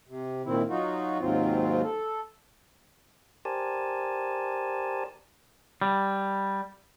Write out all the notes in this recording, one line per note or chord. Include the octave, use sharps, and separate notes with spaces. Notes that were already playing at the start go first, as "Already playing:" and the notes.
C3
A#2 D#3 C4 E4
F#3 D#4 F4 F#4
D#2 G#2 F#3 C4 F4
A4
G4 A#4 C5 D5 G#5 A5
G3